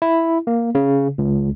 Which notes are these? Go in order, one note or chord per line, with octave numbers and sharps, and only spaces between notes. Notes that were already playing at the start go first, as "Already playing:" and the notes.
E4
A#3
C#3
C#2